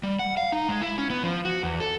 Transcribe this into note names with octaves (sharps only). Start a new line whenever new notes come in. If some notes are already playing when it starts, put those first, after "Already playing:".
G3
F#5
F5
D#4
G#3
E4
C#4
B3
F3
F#4
E2
A4